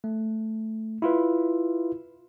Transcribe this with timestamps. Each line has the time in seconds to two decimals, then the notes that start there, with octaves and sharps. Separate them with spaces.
0.04 A3
1.02 E4 F4 B4